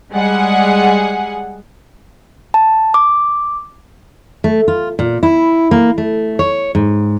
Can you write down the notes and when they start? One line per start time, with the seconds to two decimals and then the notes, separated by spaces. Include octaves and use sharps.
0.12 G3 G#3 G#4 F#5
2.54 A5
2.94 D6
4.44 A3
4.68 F4
4.99 A#2
5.23 E4
5.71 A#3
5.98 A3
6.39 C#5
6.75 G#2